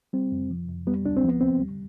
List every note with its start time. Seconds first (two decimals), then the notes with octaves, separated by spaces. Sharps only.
0.13 G3 C4
0.32 F2
0.51 F3
0.68 F2
0.87 G3 B3
1.06 D2 D4
1.17 C4
1.24 F3 B3
1.41 D#2 C4
1.60 G3